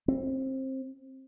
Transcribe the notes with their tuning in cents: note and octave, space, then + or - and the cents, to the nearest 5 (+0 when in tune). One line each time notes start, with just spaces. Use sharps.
C4 +20